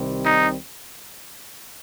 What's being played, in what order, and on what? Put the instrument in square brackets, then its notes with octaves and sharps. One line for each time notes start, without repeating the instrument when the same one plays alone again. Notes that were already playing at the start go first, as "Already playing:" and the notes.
Already playing: [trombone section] C2 C3 D#3 G3 C4
[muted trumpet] D#4